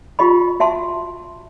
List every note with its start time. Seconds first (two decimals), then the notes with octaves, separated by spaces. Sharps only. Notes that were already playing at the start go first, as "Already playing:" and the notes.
0.19 F4 G4 D#5 B5
0.60 F#4 E5 A5 C6